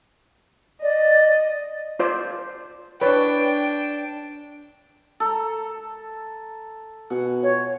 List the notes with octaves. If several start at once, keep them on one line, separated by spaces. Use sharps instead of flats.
D5 D#5
F4 C5 D5
D4 B4 C#5 G5
A4 A#5
B2 F#5 G#5
F4 C#5